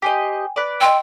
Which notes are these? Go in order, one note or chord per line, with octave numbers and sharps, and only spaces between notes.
G4 C5 D#5 G5 G#5
B4 D5
D#5 G5 C6 E6